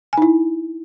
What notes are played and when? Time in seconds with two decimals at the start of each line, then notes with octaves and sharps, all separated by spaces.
0.13 G#5
0.17 D#4
0.22 E4